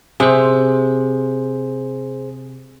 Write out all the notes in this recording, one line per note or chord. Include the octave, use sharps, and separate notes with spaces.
C3 G#4 C5